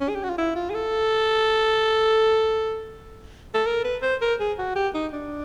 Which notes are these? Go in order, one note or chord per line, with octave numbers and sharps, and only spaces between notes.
C#4
G#4
G4
F#4
F4
E4
F4
G#4
A4
A4
A#4
B4
C5
A#4
G#4
F#4
G4
D#4
D4